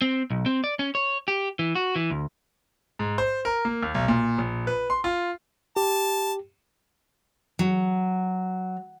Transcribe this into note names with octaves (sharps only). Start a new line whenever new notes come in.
C4
B1
C4
D5
C#4
C#5
G4
E3
F#4
E3
D2
G#2
C5
A#4
A#3
D#2
B1
A#2
A#1
B4
C6
F4
G4 A5
F#3